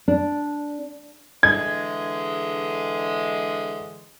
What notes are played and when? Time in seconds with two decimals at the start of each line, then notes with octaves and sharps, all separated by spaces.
0.08 D4
1.43 D3 E3 G#3 G#6